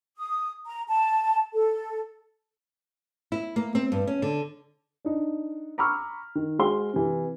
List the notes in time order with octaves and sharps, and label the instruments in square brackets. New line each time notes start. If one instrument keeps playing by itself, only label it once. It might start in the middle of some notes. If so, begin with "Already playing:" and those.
[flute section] D#6
A#5
A5
A4
[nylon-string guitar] E4
A#3
C4
G2
C#4
D3
[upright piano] D4 D#4
A#5 B5 C#6 D6 E6 F6
D#3
G#3 F#4 G#4 C5 C6 G7
C3 E3